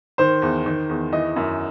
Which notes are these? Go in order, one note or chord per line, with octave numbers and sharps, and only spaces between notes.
D#3 C5
E2
D#3
E2
E3 D#5
F#2